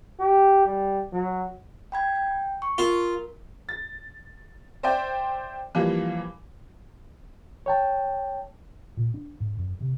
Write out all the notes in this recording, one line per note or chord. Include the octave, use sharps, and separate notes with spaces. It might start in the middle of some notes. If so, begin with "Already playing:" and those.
G4
G3
F#3
G5 B5 G#6
G5
C#6
F4 A#4
A6
C5 D5 E5 G5
E3 F3 G3 A#3
C#5 G5 A5
A#2
D4
G#2
F#2
C3